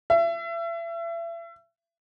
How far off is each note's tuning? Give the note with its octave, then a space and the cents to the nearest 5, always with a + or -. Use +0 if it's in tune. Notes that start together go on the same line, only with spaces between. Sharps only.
E5 +35